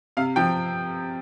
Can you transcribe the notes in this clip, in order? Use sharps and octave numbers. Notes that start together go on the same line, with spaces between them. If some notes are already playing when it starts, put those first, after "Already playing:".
C3 F5
F3 G5